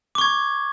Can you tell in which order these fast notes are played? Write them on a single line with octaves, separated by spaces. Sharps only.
D6 C#6 G#6